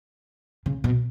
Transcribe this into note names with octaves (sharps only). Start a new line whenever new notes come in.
C#3
B2